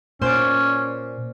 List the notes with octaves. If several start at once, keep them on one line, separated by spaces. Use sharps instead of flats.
A#2 C#4 C5 D5